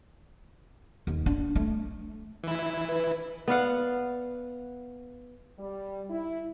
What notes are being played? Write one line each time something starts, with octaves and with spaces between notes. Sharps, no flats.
D#2
D4
A3
E3 E4
B4
B3 D5 F5 F#5
G3
E4